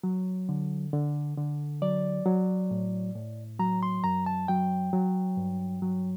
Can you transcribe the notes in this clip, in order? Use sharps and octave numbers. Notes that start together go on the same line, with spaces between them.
F#3
D3
D3
D3
F#3 D5
F#3
A2
A2
F#3 A#5
C6
F#2 A#5
A5
F#3 G5
F#3
G2
F#3